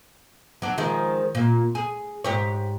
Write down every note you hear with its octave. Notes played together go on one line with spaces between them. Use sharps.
F#3 D4
D#3 F3 G#3
A#2
G#4
G#2 G4 C#5